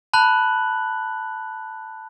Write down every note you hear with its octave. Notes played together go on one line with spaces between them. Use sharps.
A5 B5 F#6 F#7